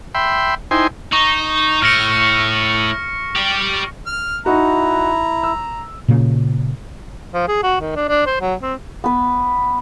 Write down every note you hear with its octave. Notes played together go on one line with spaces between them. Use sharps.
E5 G5 B5 C6
D#4 E4 C5 G5 G#5 C6
D#4 C#6
A2 F6 A#6 C#7
G4 D5
F6
D#4 E4 F#4 A#5
E6
A#2 C#3 A#3
F3
G#4
F#4
D#3
D4
D4
C5
F#3
C4
B3 B4